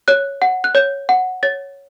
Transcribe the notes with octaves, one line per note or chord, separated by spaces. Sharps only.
C#5 F#6
F#5
F#6
C#5 G6
F#5
C#5 A6